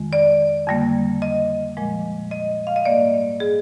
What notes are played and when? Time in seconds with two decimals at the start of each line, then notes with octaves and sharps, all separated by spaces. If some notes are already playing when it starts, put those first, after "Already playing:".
Already playing: F2 D#3 G#3
0.13 D5
0.67 F2 D3 G3 A#3
1.22 D#5
1.77 A#2 F3 G#3
2.31 D#5
2.67 F5
2.76 D#5
2.85 G#2 G3 A#3 D5
3.40 G#4